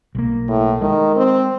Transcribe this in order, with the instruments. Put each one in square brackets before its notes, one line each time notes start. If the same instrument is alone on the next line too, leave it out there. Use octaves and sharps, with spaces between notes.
[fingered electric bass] B1 A#3
[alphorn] A2
[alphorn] D#3 [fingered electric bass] G#3
[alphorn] C4